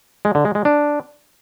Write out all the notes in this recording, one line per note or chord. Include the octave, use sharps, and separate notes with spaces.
G#3
D3
G#3
G#3
D4